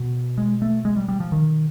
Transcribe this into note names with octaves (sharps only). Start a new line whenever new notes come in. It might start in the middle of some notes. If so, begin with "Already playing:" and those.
Already playing: B2
G#3
A3
G#3
G3
G3
F3
D#3